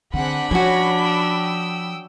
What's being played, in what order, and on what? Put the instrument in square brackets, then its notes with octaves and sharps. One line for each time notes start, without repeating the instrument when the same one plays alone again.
[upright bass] D3 [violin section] C4 G#4 F#5 [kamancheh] D4 B5
[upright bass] F3 [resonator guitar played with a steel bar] C#4 F#4 [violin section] C#5 G#6 A#6
[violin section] G5 D#6 E6